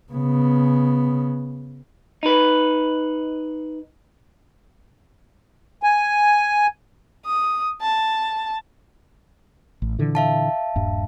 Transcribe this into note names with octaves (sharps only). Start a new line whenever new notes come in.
C#3 B3
D#4 B4
G#5
D#6
A5
A1
A#2 D3 E3
E5 F5 A5
D#1 G2